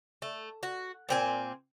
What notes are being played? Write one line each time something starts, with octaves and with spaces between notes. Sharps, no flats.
A3
F#4
A#2 C4 G#5